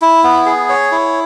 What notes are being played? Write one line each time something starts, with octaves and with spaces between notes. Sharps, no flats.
E4
B3
G#4
C#5
E4